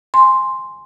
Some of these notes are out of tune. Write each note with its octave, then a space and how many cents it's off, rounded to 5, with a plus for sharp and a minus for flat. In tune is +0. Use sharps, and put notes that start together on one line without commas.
G#5 +0 C6 +0